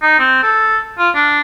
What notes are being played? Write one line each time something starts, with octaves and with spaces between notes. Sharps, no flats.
D#4
C4
A4
F4
D4